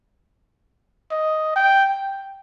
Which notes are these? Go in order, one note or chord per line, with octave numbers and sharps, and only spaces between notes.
D#5
G5
G5